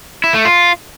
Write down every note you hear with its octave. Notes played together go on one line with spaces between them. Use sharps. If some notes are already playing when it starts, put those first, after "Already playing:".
E4
A3
F4